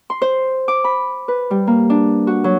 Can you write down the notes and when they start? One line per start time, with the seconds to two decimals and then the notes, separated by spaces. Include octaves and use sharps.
0.10 C6
0.22 C5
0.68 D6
0.84 B5
1.28 B4
1.51 G3
1.67 A#3
1.90 D4
2.27 F#4
2.44 F#3